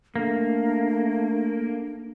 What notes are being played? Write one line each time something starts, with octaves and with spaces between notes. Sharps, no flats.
A3 A#3 D4